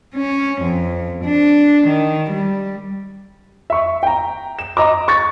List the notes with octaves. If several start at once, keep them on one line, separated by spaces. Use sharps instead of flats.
C#4
F2
D4
D#3
G3
E5 C#6
G5 A#5
E7
D#5 A#5 D6
C#6 A6